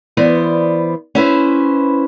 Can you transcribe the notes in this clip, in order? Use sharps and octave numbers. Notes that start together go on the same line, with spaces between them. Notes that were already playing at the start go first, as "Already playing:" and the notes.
E3 B3 C5 D5
C#4 E4 B4 C5